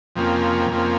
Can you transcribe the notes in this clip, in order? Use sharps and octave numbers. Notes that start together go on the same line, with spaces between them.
F2 C3 F3 A#3 C#4
F2 C3 F3 A#3 C#4